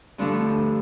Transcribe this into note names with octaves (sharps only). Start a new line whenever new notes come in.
G2 D3 F3 A3 D4